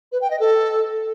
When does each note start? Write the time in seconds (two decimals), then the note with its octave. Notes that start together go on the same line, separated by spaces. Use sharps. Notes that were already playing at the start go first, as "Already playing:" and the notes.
0.12 B4
0.21 G5
0.31 D#5
0.40 A4